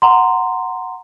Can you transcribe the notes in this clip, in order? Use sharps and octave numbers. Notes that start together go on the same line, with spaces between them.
F#5 A#5 C6